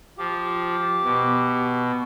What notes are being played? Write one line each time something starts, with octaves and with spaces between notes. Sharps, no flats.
F3 G4
B2